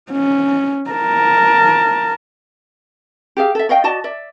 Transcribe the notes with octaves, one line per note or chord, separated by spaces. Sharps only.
C#4
A#4 A5
G4 G#4 F5
A4 E5
C#5 D#5 F5 G5
F#4 D5 D#5 A5
D5 E5